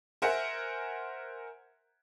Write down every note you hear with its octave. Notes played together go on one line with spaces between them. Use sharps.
A#4 C5 E5 F#5 G#5